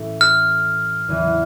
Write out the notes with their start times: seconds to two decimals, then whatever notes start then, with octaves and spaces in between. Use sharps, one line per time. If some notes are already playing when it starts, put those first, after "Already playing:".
Already playing: A2 E3 A3 C#4
0.21 F6
1.08 E2 C#3 E3